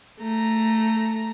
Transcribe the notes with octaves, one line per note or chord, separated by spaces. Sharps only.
A3 A#5